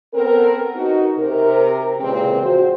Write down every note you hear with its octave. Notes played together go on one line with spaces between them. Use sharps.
B3 C4 A4 A#4
D#4 F#4
C3 A#4
A#2 C#3 E3 G#3 C4
F3 F#4 C5